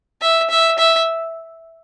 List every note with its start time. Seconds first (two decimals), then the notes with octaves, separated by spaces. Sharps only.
0.22 E5
0.50 E5
0.78 E5